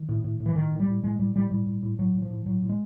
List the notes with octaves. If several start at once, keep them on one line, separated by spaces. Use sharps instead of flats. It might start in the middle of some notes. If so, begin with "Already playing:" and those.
Already playing: D#3
A2
A2
A2
E3
A2 D#3
A2
G3
A2
A2 G#3
A2 G3
A2 G3
A2 G3
A2
A2
A2 F#3
A2
F3
A2
A2 F#3
A2
G#3